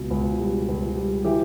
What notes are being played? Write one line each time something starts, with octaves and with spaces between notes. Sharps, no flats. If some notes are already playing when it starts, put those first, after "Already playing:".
Already playing: C#2 B2
C#2
G3
C#2
G3
E3 G4